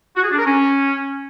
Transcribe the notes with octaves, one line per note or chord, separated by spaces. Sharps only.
F#4
G#4
D4
A#4
C#4